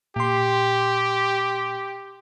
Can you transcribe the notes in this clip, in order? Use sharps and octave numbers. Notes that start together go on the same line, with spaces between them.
A#2 G4 C6